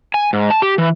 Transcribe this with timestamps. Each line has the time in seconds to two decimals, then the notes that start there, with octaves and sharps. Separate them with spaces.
0.14 G#5
0.33 G#2
0.50 A5
0.62 G4
0.78 E3